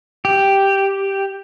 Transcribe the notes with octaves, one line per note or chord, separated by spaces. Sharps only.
G4